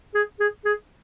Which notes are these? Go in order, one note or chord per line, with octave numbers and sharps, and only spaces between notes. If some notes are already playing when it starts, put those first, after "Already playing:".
G#4
G#4
G#4